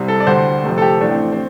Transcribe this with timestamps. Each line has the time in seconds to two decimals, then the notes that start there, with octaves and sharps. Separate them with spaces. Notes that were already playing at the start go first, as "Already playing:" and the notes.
Already playing: C2 C3 G3
0.08 A4
0.20 D5
0.27 D2 D3 G3 C5
0.64 F2 C3 A3
0.78 A4
0.82 G4
1.01 A1 A2 A3 D4
1.11 C4
1.32 C4